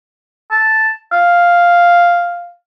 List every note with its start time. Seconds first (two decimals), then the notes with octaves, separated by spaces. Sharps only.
0.51 A5
1.12 F5